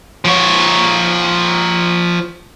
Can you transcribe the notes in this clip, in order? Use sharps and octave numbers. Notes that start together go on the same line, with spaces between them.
F3 C#5